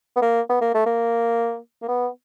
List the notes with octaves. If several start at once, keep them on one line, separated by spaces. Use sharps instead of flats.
B3
A#3
B3
A#3
A3
A#3
A#3
B3